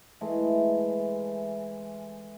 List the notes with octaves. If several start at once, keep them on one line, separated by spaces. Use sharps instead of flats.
E3 G#3 A3